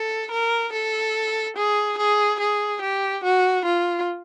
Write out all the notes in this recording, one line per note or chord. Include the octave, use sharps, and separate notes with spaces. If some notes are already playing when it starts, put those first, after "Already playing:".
Already playing: A4
A#4
A4
G#4
G#4
G#4
G4
F#4
F4